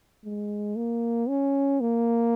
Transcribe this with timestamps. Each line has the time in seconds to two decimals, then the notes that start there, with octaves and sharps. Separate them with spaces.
0.24 G#3
0.76 A#3
1.29 C#4
1.80 A#3